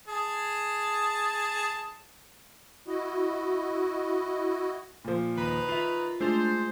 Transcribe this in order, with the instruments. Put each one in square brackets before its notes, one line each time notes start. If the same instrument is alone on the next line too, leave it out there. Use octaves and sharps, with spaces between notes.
[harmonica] G#4 A5
[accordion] E4 F#4 D#5
[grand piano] A#2 F3
[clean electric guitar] D#2 [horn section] D#3 B4 A#5
[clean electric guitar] F4 E5 [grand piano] F7
[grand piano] G#3 [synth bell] A3 F4 [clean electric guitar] D4 [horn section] C5